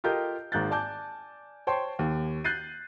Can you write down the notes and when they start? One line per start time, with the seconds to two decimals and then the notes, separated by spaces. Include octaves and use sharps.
0.04 F4 G4 A4 A#4 D#5 G6
0.52 G#1 G#2 A#3 F#6 G6 A6
0.71 D5 G#5 A5 D6 G6
1.67 C5 C#5 G5 A5 C6
1.99 D#2
2.44 F#6 G6 A6 C7 D#7